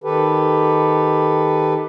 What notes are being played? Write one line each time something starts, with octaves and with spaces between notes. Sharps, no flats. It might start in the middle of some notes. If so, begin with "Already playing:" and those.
D#3 G4 A4 B4